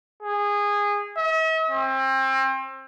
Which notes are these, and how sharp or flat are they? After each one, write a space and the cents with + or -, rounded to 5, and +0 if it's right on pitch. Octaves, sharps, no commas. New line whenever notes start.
G#4 -20
E5 -45
C4 +30